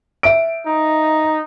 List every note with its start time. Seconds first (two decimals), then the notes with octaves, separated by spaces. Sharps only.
0.23 E5 D7
0.67 D#4